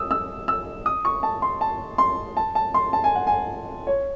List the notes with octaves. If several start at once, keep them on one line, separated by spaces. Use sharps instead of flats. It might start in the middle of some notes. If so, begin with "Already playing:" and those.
Already playing: D#6 E6
E6
E6
D#6
C#6
A5
C6
A5
C6
A5
A5
C6
A5
G#5
F#5
G#5
C#5